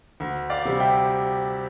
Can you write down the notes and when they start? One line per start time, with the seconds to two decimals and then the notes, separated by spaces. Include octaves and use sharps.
0.20 D2
0.50 D5 F5
0.65 C3 G3
0.80 E5 G5